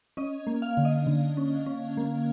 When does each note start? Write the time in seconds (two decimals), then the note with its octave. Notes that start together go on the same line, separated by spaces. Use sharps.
0.17 C#4 D#5
0.47 A#3
0.62 F5
0.77 D3
0.85 D#5
1.07 D3
1.37 C#4
1.66 C#4
1.97 A#3